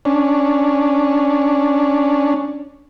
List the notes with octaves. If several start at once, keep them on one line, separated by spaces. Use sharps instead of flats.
C#4 D4